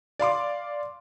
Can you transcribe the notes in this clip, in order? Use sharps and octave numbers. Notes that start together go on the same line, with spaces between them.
D5 F5 C6 D6